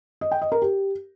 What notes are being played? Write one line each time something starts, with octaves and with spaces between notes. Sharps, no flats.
D#5
G5
D#5
A#4
G4